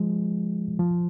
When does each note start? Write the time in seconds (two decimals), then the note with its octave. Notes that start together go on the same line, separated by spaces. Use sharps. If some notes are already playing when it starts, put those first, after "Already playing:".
Already playing: F3 G#3
0.79 F3